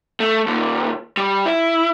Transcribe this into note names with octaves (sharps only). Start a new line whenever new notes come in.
A3
D#2 A#2
G3
E4